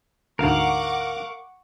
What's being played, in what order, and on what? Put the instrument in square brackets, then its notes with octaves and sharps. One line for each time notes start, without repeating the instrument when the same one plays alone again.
[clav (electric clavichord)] D2 G#2 [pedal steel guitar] A#4 F5 [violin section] F#5 C#6 D6